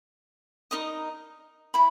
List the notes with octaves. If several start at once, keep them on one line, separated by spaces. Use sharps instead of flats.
D#4 A#4 D#5 D#6
E4 B5